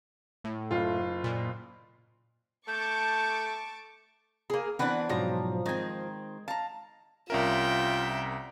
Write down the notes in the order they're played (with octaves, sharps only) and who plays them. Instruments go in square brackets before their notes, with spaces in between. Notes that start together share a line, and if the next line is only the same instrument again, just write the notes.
[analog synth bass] A2
[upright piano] F#1 F4
[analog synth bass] A#2
[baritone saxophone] A3 [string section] A5 C#6 D6 [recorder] G6
[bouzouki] A#3 G#4
[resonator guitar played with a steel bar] E3 C4 D4 [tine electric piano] B3 [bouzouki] B4 F#5
[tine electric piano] G#2 B2 F#3 [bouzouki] F3 A#5
[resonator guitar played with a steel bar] D#3 C4 [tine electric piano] G#3 D#5 G#6
[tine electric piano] F5 [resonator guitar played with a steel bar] A5 A#5
[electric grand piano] C2 C#4 A#4 [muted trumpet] F4 [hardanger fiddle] E5 G5